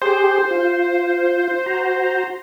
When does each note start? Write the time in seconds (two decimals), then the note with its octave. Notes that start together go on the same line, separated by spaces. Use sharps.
0.02 G4 G#4 C5
0.51 F4
1.66 F#4 A#5